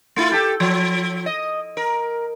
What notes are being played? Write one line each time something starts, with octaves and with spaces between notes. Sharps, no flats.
A3 E4 F4
G4 A4
F3
D#5
A#4